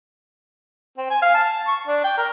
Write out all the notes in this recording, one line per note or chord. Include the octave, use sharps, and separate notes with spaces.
C4
G#5
F5
A5
C#6
D4
G5
A#4